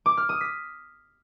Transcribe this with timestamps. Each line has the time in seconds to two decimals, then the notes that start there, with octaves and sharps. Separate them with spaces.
0.06 D6
0.17 F6
0.29 D#6
0.41 B6